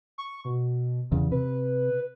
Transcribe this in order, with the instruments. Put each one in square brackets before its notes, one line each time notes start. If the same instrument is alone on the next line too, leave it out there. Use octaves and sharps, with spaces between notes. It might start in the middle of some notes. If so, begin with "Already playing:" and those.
[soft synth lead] C#6
B2
[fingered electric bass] E2 C#3
[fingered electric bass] C3 [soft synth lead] B4